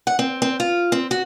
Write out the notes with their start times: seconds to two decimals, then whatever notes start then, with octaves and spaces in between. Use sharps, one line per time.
0.07 F#5
0.19 C4
0.42 C4
0.60 F4
0.92 C4
1.11 F#4